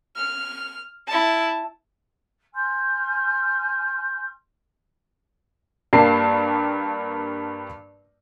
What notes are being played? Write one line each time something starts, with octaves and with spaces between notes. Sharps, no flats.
F6
E4 A5
G#5 C6 F6 G6
G2 G3 A#3 A5 C7